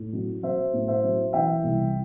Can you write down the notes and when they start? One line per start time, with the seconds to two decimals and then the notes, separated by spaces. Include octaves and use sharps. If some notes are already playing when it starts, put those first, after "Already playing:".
Already playing: A2
0.13 F#3
0.43 F#3 C5 E5
0.73 A2
0.88 C5 E5
1.04 F#3
1.33 E3 E5 G5
1.64 C2